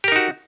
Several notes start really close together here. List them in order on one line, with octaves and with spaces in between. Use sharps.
G4 A#4 D#4 F#4